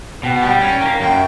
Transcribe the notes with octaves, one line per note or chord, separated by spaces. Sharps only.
B2 G5
F#5
G3 G5
C#4
A#3
F#2 G5